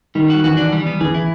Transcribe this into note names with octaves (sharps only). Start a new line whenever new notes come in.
D#3 G3
F#4
E3 F#4
D4
G3
B3
E3 G#4
E4